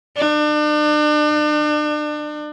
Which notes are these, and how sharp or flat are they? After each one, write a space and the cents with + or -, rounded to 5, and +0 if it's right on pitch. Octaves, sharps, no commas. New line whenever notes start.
D4 +35